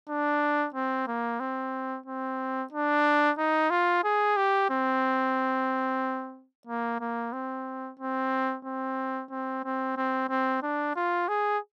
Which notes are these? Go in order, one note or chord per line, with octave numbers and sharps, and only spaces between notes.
D4
C4
A#3
C4
C4
D4
D#4
F4
G#4
G4
C4
A#3
A#3
C4
C4
C4
C4
C4
C4
C4
D4
F4
G#4